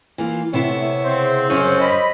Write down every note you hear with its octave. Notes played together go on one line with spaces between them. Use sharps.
E3 A#3 F4
C3 A3 B3 E4 C#5
C#3 C4 C5
F#2 C#4 C5
D#5 B5